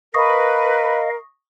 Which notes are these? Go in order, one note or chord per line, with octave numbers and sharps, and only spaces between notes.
A#4 B4 D#5 F5 C#6 D#6 A#6